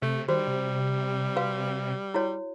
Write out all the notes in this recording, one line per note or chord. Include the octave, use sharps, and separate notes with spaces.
C3 A3
D#3 G3 F#4 C5
C3
F#4 B4 F5
E4 F#4 C#5